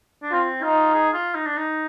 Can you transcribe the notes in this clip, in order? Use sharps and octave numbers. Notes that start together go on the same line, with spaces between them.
D4
C4 F4
D#4 F4
G#4
F4
D#4
D4
D#4